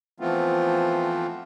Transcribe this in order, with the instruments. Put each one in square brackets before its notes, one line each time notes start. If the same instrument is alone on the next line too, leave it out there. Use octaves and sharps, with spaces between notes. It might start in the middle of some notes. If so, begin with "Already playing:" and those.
[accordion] E3 F3 A3 B3 C4 F4